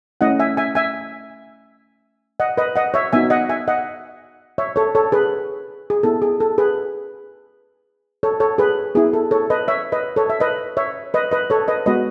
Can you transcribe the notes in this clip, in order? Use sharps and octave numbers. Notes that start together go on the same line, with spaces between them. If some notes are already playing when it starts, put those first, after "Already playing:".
A3 C#4 E4 D#5 F#5
E5 G#5
E5 G#5
E5 G#5
D#5 F#5
B4 D#5
D#5 F#5
C#5 E5
B3 D#4 F#4 E5 G#5
D#5 F#5
E5 G#5
D#5 F#5
C#5 E5
A4 C#5
A4 C#5
G#4 B4
G#4
B3 E4 A4
G#4
A4
G#4 B4
A4 C#5
A4 C#5
G#4 B4
B3 E4 G#4
A4
A4 C#5
B4 D#5
C#5 E5
B4 D#5
A4 C#5
E5
B4 D#5
C#5 E5
B4 D#5
B4 D#5
A4 C#5
B4 D#5
G#3 B3 F#4 B4 D#5